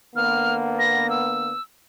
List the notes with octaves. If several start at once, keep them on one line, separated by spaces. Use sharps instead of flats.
D3 A#3 B3 F6
A#6
E6